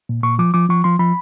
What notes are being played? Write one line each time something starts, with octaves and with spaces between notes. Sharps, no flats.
A#2
A#2 C#6
F3 D6
F3 D6
F3 C#6
F3 C6
F3 B5